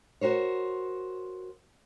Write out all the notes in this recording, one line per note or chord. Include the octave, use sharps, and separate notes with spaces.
F#4 A#4 C5 C#5